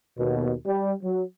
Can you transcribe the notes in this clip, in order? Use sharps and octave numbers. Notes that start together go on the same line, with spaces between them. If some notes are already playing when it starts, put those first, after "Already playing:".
D#2 B2
G3
F#3